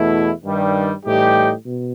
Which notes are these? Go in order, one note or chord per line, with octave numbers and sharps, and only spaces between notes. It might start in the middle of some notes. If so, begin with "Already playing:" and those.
Already playing: E2 B2 A3 E4
G2 D#3 G3
A2 E3 G3 D#4 G4
B2